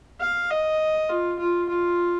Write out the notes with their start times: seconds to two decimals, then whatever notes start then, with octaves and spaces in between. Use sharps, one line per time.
0.21 F5
0.50 D#5
1.09 F4
1.39 F4
1.69 F4